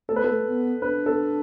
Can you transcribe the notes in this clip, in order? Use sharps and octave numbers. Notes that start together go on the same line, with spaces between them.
A3 A4
B4
B3 A4
A3
B3
D4 B4
A4